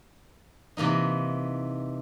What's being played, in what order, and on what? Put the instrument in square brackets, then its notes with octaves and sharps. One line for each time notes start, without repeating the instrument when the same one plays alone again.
[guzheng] C3 E3 A#3 D#4